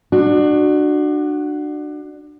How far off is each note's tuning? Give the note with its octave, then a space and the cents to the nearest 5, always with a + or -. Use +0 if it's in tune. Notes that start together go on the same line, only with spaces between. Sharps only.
D4 +25 F#4 +0